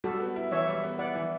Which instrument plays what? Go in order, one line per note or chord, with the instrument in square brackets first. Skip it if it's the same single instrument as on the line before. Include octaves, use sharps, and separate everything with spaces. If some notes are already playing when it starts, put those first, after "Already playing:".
[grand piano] G3 [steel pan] F#4 A4
[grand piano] B3
E4
[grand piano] E3 [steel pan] C#5 E5
[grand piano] G3
B3
[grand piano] E4 [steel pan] D5 F#5
[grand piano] E3